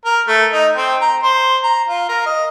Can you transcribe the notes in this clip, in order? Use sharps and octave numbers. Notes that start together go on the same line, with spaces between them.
A#4
A3
D#4
C4
A#5
C5
A#5
F4
A#4
D#5